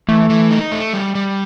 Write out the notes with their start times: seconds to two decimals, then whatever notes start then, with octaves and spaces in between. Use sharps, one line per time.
0.09 E3 A3
0.30 E3
0.51 D#4
0.72 A3
0.93 G3
1.15 G3